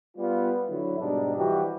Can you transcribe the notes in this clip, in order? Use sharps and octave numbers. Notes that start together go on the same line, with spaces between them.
G3 B3 F4
D3 F#3 E4
G#2 B2 G3 D4 D#4
E3 F3 G3 F#4 G4